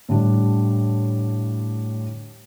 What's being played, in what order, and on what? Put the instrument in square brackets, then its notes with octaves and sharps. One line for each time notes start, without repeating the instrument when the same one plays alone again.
[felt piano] A2 D3 G3 D4